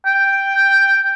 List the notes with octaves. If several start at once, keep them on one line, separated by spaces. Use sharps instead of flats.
G5